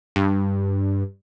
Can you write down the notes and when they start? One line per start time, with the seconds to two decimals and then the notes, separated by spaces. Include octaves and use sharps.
0.16 G2